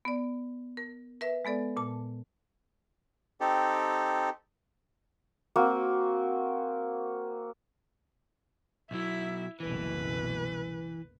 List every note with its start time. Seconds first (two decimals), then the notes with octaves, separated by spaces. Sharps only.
0.05 B3 D5
0.77 A#4
1.21 A#4 B4 E5
1.45 G#3 B3 A4 D5
1.77 A#2 A5
3.41 C4 D#4 G4 A4
5.56 A#3 C4 F#4
8.91 B1 F#3 E4 E5
9.60 F#1 C2 B2 E3 B4